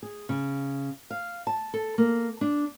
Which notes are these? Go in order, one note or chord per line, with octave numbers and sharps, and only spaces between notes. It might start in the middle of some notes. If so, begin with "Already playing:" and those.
G#4
C#3
F5
A5
A4
A#3
D4